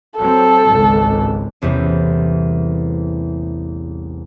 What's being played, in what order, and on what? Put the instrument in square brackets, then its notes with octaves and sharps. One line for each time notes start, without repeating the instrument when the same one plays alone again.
[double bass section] F#3 C4 [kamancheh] A4
[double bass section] G#1 C#2
[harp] A1 E2 C3 G3